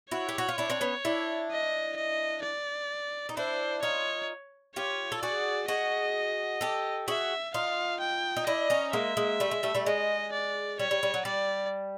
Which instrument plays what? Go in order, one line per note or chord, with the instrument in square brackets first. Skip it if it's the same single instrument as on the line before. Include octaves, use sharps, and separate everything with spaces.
[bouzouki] E4 F#4 [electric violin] C#5
[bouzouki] G4
F#4
F4
D4 E4
C4 D4
B3 C#4
D4 E4
[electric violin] D#5
D#5
D5
[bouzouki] D#4
[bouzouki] D4 E4 [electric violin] C5
[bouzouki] D#4 F4 [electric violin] C#5
[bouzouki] F4 G4 [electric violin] C#5
[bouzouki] A4
[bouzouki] F#4 G#4 [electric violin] D5
[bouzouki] F#4 G#4 [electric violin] D#5
[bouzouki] G4 A4
[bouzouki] F#4 G#4 [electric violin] E5
[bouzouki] D#4 F4 [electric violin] F5
[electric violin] G5
[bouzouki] D#4
[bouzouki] D4 E4 [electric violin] D#5
[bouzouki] C#4 D#4
[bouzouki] G#3 A#3 [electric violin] E5
[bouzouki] G#3 A#3
G3 A3
G#3
G3 A3
G3 A3
[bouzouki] G#3 [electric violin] D#5
[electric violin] D5
[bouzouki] G3 [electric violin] C#5
[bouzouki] G3
G3
F#3
[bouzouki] G3 [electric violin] D5